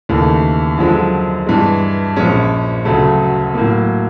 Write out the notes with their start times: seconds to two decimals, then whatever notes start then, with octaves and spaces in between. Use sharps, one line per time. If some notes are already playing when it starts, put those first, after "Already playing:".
0.09 D#2 C#3 E3 A3
0.77 F#2 D3 F3 G#3
1.46 G2 E3 G#3
2.16 A#1 A#2 F3 G#3 C#4
2.85 D2 C#3 F#3 A3
3.54 A2 F#3 A#3